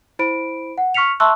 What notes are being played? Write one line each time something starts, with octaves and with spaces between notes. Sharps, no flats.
E4 C5 B5 D7
F#5
C#6 F6 B6 C#7 F7
E5 A5 C6 C#6 E6 F#6